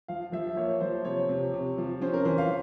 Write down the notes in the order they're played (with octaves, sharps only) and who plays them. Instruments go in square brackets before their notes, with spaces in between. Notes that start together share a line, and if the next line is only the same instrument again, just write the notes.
[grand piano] F3 F5
F3 E5
A#3 C#5
F3 C5
C3 C#5
C3
C3
F3
C#4 C5
A#4
E3 C5
F5